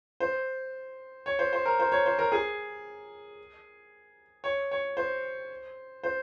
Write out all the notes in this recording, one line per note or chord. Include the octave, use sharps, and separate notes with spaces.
C5
C#5
C5
C5
A#4
C5
C#5
C5
A#4
G#4
C#5
C#5
C5
C5